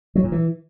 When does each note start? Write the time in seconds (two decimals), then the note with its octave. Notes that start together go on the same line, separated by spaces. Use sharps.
0.15 F#3
0.24 A#2
0.32 E3